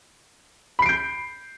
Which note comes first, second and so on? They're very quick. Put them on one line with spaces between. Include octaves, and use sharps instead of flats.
B5 C7 D7 G6